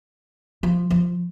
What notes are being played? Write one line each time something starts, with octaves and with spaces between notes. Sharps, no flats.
F3
F3